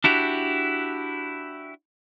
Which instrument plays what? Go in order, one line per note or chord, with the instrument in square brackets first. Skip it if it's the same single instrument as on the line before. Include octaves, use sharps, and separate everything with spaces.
[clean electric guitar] D4 E4 F#4 G4